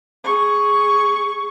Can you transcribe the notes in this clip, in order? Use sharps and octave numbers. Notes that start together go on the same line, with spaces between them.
G#4 C#6